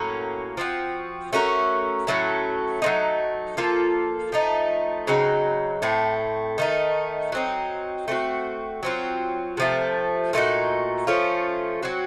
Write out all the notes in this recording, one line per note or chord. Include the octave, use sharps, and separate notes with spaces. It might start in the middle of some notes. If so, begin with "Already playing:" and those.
Already playing: A2 F#3 A#3 C#4
F3 C4 F#4
A3 C#4 F#4 A#4
A2 F#3 A3 C#4
F#3 A3 C4 D#4
F3 A#3 F4 A4
F3 A3 D#4
C#3 F#3 C4 D#4
A2 A3 C4
D#3 A3 D#4
F#3 C4 D#4
A3 C4 F#4
F#3 C4 F4
C3 F3 A3
A#2 A3 D#4 F#4
F3 A3 C#4 F4
F#3 C4 F#4